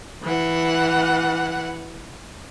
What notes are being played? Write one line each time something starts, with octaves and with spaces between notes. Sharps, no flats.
E3 F#5